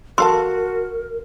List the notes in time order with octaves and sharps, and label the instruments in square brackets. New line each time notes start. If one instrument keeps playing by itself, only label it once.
[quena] F#4 [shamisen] A4 F5 A5 [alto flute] A#4 [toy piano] C6